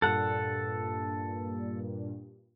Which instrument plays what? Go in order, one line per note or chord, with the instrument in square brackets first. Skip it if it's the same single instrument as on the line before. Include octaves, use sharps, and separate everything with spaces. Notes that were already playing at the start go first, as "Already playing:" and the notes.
[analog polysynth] G2 A#2 [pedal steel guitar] A4 F#5